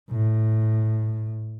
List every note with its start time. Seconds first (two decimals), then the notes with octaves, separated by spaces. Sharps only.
0.11 A2